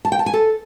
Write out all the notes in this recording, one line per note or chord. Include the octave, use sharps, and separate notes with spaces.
A5
G5
A5
G#5
A4